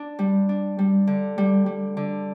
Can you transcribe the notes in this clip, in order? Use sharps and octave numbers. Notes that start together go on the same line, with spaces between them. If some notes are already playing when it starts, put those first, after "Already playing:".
Already playing: D4
G3
D4
G3
D3
G3
G3
D3